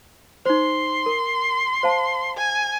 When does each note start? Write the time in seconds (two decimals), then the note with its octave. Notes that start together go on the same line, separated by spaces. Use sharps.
0.46 D#4 C5 C6
1.06 A#4
1.83 C5 F5 A5
2.37 G#5